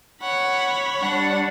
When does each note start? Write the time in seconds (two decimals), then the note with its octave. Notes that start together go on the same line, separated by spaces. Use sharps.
0.22 C#5 F#5 B5
0.99 G3 D4 F#5